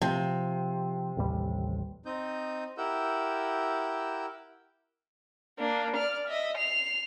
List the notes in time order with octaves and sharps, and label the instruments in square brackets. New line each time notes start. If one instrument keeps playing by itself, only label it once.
[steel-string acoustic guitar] C3 [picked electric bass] F3
[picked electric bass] A1 D#2 G3
[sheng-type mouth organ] C4 D#4 D#6 G6
E4 G4 A#4 F#5 E6 G6
[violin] A#3 D4
D5 F6
D#5 E5
C7 F7